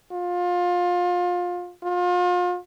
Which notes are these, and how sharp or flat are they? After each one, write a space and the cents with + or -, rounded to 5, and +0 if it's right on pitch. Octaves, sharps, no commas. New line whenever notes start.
F4 +25
F4 +35